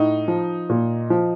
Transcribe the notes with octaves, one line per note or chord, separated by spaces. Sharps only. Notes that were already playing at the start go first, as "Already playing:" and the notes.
Already playing: A2 D#4
F3
A#2
F3